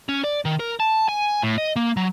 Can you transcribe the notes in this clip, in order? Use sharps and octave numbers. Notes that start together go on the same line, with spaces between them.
C#4
D5
D#3
A#4
A5
G#5
A2
D#5
A#3
F#3